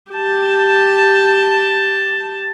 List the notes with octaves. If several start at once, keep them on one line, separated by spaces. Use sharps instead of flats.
G4 A5